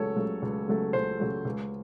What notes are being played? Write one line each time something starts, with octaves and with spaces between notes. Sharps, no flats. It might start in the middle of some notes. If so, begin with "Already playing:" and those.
Already playing: C#2 C#3 F#3 A3 A4 C#5
C#3 F#3 A3
C#2
C#3 F#3 A3
C#2 C5
C#3 F#3 A3
C#2